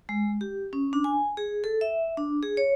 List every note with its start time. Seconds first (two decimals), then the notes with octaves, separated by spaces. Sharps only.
0.09 G#3
0.41 G4
0.73 C#4
0.93 D4
1.04 G#5
1.37 G#4
1.64 A4
1.81 E5
2.17 D4
2.43 G#4
2.57 C#5